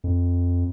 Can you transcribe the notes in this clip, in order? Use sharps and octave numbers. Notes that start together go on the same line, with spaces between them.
F2